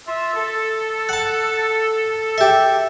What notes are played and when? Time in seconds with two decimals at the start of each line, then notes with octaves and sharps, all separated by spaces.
0.07 F4 E5
0.36 A4
1.09 F#5 A5
2.38 G4 E5